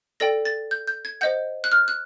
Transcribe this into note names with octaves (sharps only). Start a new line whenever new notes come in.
A4 D5 G5 A#6
A6
G6
G6
G#6
C5 D#5 F#5 G6
F#6
F6
F#6